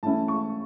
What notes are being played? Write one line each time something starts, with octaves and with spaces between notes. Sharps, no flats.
E3 A3 C#4 E4 A5
C#6